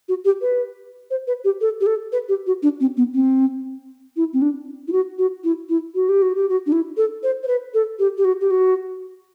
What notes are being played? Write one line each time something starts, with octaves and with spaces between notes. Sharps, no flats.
F#4
G4
B4
C5
B4
G4
A4
G4
A4
B4
G4
F#4
D4
C4
B3
C4
E4
C4
D4
E4
F#4
F#4
E4
E4
F#4
G4
F#4
G4
F#4
D4
E4
A4
C5
C5
B4
A4
G4
G4
F#4
G4
F#4